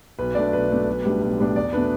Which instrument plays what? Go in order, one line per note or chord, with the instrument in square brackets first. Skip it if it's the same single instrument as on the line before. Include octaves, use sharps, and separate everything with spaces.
[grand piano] B1 B4
B2 A3 D4 D5
B1 B4
B2 A3 D4
B1
A2 G3 B3 D4
B1
A2 G3 B3 D4
E2 D5
B2 A3 D4 B4